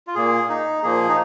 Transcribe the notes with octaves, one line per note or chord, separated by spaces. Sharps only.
F4
A#2 A#3 G#4
D#4
A#2 F3 A#3 G#4
D#4